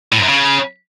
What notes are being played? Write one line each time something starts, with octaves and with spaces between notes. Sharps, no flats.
A2
G2
F#2
C#3